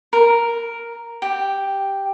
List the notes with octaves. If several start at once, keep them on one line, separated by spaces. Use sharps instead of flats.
A#4
G4